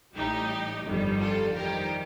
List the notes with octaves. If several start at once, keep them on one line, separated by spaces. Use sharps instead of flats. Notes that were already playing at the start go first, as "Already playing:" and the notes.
A1 A2 G3 D#4 G4
G1 F2 D#3 G3
F4 A4
F2 D#3 G3 G4 A#4